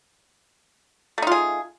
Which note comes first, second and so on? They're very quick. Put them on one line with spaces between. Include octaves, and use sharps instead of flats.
A3 D#4 F4 G#4